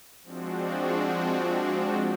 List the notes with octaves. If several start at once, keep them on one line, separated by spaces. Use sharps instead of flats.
F3 G#3 C4 D4 F#4